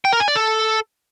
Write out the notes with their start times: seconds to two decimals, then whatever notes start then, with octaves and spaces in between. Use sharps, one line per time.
0.05 G5
0.12 A#4
0.20 G#5
0.28 D5
0.36 A4